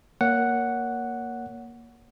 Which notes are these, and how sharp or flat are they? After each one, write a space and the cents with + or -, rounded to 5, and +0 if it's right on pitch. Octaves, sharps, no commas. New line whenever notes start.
A#3 +0 C#5 +25 F#5 +0